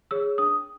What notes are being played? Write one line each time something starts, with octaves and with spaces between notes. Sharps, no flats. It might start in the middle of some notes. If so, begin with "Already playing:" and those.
G#4 C#5 E6
D4 D#6